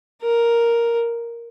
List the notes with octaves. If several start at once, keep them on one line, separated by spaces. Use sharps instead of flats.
A#4